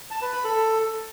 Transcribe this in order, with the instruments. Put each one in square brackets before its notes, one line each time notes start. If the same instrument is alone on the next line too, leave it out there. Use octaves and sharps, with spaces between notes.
[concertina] A5
B4
B5
A4